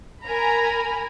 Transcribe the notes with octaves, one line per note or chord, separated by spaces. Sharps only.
A#4 G#5 A#5 B5